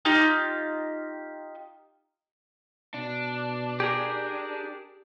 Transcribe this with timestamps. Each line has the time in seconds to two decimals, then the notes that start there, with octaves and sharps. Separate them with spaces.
0.05 D#4 F4 G4
2.94 B2 D4
3.80 G4 G#4 A#4